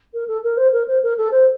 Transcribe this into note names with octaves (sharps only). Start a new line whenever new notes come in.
A#4
A4
A#4
C5
A#4
C5
A#4
A4
C5